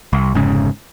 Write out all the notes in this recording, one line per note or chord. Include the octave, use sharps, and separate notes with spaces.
C2
F1 G#2 C#3